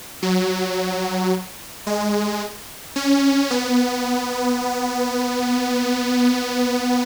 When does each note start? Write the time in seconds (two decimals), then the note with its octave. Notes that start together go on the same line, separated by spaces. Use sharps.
0.22 F#3
1.87 G#3
2.96 C#4
3.51 B3